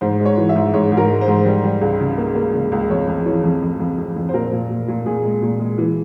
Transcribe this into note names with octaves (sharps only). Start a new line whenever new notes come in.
G#2 C5
G#3
C#5
E3
E5
G#2
G#2 C#5
G#2
A#4
G#3
C5
G#2
G3
G3
C#2
C#3
A#3
A#3
C#3
C#2
F2 C#5
F2
E3 C#5
F2
F2
F2
F2
F2
C5
A#2 A#4
A#2
A#2
A#2
A#2 G#4
G#3
A#2
G#3
E3